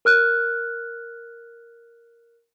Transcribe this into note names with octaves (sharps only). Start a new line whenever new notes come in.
A#4 F6 F#6